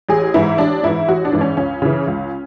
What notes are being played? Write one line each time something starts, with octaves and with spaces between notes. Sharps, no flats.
A1 G#4
G#2 E3 E4
A1 D4
G#2 E3 E4
A1 F#4
D4
G#2 E3
C#4
C#2 C#4
C#3 E3
C#2